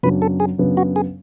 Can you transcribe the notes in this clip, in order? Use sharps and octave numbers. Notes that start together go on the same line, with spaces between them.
F#2 C#3 F#3 B3 D4 B4
A4
G#4
F#2 C#3 F#3 B3 D4
F#4
G#4